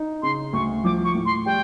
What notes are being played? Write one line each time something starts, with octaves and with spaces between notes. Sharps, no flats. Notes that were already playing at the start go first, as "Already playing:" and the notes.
Already playing: D#4
C#3 C6
D2 C#6
F3 D6
C#6
A2
C6
G3 G5